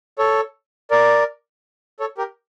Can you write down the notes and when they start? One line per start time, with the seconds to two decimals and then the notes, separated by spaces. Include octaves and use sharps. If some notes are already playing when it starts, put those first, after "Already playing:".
0.18 A4 C#5
0.91 A#4 D5
2.00 A4 C#5
2.18 G4 A#4